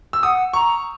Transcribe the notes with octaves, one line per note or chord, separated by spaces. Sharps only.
E6
F#5 D#6
A#5 C#6